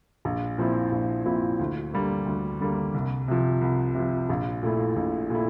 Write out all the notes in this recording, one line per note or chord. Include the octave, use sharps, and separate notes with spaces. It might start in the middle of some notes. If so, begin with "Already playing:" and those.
A#1
A#2 F3 C4 E4
A#1
A#2 F3 C4 E4
D2
D3 G3 A#3
D2
D3 G3 A#3
C2
C3 F3
C2
C3 F3
A#1
A#2 A3 E4
A#1
A#2 A3 E4